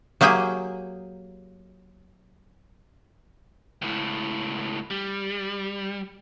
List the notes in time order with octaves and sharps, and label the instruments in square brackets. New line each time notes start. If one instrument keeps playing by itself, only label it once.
[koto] F#3 A#3 G4 G#4 G5
[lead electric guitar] C#2 A2
G3